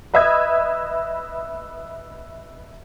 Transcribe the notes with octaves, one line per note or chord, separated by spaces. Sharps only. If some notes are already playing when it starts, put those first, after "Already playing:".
B4 D#5 E5 B5 D#6 G#6